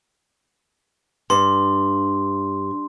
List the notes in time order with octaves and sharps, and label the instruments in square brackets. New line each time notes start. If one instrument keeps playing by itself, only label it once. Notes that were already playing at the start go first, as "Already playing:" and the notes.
[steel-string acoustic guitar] G2 [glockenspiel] C6